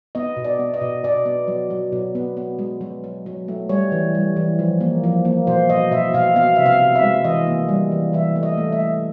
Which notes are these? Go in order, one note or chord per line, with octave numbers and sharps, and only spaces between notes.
B3 D#5
B2
D5
B3
D#5
B2
B2 D5
B3
F#3
F#3
B2
B3
B3
G#3
F#3
F#3
F#3
A3
G3 C#5
E3
G3
E3
F3
A#3
F3
A#3
B2 C5
B2 D#5
B2 E5
B2 F5
B3 F5
C3 E5
F5
C3
E5
G#3
E3 D#5
A#3
G3
E3
E3 E5
A3
D#5
A3
E5
A3